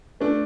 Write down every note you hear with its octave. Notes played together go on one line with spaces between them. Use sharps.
A3 D4